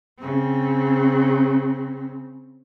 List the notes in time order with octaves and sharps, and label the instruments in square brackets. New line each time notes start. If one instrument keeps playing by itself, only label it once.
[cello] C#3 C4